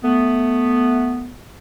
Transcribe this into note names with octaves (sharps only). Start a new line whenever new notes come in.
A3 B3